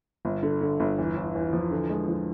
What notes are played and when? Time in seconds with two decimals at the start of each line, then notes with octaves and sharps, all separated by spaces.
0.25 G1
0.43 D3
0.61 D3
0.80 G1
0.98 E2
1.17 E2
1.35 E2
1.53 F3
1.71 D3
1.90 G#3
2.08 F3